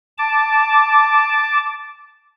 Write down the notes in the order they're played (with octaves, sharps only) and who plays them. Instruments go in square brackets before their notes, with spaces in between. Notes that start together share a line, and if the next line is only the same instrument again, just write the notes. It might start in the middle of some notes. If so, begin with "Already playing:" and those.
[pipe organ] A5 D6